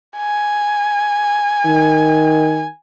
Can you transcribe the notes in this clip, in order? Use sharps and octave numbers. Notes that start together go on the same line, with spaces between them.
G#5
D#3